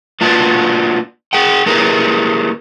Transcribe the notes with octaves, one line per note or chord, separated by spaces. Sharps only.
A#3 D4 F4 F#4 B4 D5
G#4 F#5 G5
A#3 E4 G4 G#4 A#4 B4